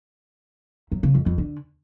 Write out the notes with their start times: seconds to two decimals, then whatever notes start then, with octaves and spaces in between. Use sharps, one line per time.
0.92 F#2
1.03 C#3
1.15 F2
1.26 F2
1.38 D3